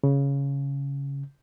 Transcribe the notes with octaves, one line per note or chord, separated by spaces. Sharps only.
C#3